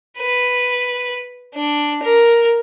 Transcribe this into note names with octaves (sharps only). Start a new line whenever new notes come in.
B4
D4
A#4